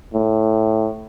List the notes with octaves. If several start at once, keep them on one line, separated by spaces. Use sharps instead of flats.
A2